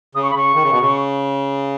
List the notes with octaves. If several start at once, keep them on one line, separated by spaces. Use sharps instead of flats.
C#3 D#6
C#6
B5
C#3 C#6
D#3
C#3
B2
C#3